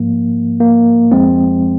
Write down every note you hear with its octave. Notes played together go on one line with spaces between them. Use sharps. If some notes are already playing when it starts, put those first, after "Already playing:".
Already playing: G#2 F3 A#3
A#3
F2 F3 G#3 C4